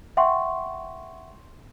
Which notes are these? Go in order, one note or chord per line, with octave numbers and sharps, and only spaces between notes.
E5 F#5 G5 C6 C#6